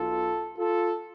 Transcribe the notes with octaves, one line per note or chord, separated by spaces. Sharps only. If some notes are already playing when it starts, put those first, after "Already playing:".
Already playing: B1 B2 F4 A4
F4 A4